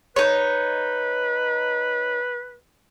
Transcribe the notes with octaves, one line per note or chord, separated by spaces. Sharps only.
D#4 B4 C#5